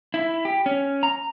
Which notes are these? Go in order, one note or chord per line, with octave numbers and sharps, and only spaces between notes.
E4
G4
C#4
A#5